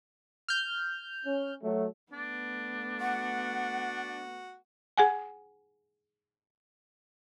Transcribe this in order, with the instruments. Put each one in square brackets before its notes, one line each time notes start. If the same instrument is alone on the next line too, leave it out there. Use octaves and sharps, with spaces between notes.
[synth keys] F6 G6
[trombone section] C#4
F#3 A3
[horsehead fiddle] A3 B3 [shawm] D4
[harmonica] F#4 [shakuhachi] F#5
[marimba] G#4 F#5 G#5